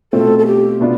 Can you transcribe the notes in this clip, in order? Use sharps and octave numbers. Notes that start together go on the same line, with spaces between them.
B2 A3 C4 F4 A4
A4
G4
B2 B3 D4 F4